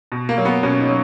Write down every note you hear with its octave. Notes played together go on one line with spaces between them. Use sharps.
B2
A#3
F#3
B3
B2 C#4
D#4
F#3